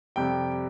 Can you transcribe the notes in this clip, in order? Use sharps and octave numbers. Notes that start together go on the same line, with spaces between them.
F2 C3 G3 G5